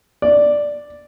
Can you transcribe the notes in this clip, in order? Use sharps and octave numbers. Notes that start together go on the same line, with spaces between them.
D5